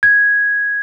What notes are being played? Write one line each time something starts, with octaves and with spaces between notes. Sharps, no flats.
G#6